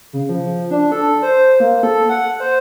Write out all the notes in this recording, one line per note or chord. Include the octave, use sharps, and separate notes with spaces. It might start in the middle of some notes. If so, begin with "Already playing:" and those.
C#3
F3
D4
A4
C5
A#3
A4
F#5
C5